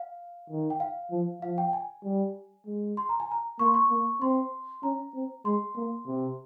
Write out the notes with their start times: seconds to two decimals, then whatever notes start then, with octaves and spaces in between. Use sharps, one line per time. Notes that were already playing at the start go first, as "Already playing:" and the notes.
Already playing: F5
0.50 D#3
0.70 G5
0.80 F5
1.11 F3
1.42 F3 F5
1.58 G5
1.73 G#5
2.04 G3
2.66 G#3
2.97 C6
3.09 A#5
3.20 G#5
3.31 A#5
3.59 A#3 C#6
3.66 C6
3.74 C#6
3.90 A#3
4.22 C4 C6
4.83 C#4 A#5
5.14 C4
5.45 G#3 C6
5.76 A#3
6.07 C3